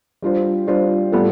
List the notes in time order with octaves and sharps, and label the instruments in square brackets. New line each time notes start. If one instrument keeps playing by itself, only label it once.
[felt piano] G3 D4 F4 C5
G3 D4 F4 C5
A2 G3 B3 F4 A4